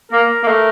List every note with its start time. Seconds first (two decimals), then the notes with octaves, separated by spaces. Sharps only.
0.12 A#3 A#4
0.43 A#3
0.47 A3